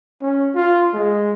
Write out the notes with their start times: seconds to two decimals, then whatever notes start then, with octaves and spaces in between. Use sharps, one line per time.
0.22 C#4
0.55 F4
0.93 G#3